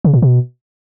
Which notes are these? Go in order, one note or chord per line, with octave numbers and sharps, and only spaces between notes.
C#3
A#2
B2